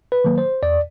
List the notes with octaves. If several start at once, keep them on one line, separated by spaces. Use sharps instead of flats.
B4
D#3 F#3 A#3
C5
E2 D5